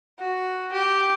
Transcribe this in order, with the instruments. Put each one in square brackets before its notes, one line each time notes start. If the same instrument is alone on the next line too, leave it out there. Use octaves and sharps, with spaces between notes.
[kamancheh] F#4
G4